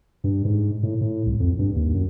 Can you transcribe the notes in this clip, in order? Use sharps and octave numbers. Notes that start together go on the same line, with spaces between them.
G2
G#2
A2
A2
C2
F2
G2
D#2
F#2